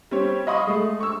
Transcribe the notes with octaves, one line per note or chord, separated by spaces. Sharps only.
G3 C4 C#5
D#5 F5 B5 C#6 D#6
G#3 A3
C#6 E6